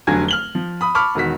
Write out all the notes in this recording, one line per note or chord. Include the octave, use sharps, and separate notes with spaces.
F1 D3 F#3 G#5 G#6
F6 F#7 G7
F3
B5 D#6
A5 B5 C#6 D6 F6
E1 D#3 F#4 B6